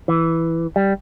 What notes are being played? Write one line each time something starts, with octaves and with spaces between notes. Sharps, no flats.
E3
G3